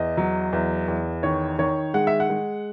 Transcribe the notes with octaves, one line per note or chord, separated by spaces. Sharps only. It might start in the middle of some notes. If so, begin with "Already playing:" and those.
Already playing: E2 D#5
F#3
E2
E2
D#3 C#5
D#3 C#5
G#3 F#5
E5
F#5
G#3